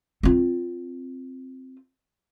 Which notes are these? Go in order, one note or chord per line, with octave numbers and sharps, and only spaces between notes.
C4 F4